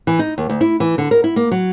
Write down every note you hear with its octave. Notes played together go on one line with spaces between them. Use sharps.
E3
D#4
D#2
D2
E4
E3
D3
A#4
E4
A#3
F#3